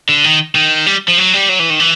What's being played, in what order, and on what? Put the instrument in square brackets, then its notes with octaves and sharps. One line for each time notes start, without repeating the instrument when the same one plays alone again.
[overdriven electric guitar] D3
D#3
D#3
G3
F3
F#3
G3
F#3
E3
D#3
E3